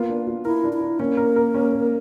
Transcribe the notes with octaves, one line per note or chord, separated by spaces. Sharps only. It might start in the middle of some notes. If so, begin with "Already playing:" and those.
Already playing: A#3 B3 F4
D4
F4
E4 A#4
D4
E4
D4
A#3 C#4
A#4
A#4
C#4
A#4